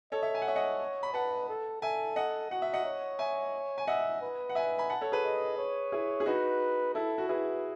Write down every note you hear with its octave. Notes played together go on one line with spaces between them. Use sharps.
A4 C#5 D#5
C#5 E5
G#5
F#5
C#5 E5
D#5 F#5
B5
B4 F#5 A5
A4
A4 E5 G#5
D#5 F#5
F#4 F#5
E5
D#5 F#5
C#5
E5 G#5
G#5
D#5 E5 F#5
B4
F#5
E5 G#5
G#5 B5
F#5 A5
A4 C#5
G#4 B4
D#5
C#5
E4 G#4
G#4
D#4 F#4 B4
E4 A4
F#4
E4 G#4 B4